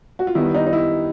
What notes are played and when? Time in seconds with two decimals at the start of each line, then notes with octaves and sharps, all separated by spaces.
0.19 F#4
0.27 F4
0.35 D#3 G3 B3 E4
0.54 D#4
0.67 D#4
0.73 E4